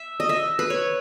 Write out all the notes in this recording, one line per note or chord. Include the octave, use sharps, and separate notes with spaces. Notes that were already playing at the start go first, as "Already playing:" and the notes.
Already playing: E5
D#5
E5
B4
C#5